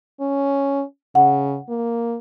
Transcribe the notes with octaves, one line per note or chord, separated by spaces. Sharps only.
C#4
C#3 F#5
A#3